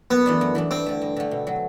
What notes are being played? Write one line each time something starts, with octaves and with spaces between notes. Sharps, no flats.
F#2 B3
E3 A3 D4
F#2
E3 A3 D4
G2 C4
D3 A3
G2
D3 A3
B2
F#3 A3